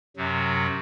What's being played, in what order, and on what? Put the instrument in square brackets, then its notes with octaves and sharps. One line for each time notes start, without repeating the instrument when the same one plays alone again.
[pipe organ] F#2 C3 F#3